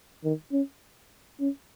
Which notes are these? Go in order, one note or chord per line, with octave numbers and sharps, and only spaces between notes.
D#3
C#4
C#4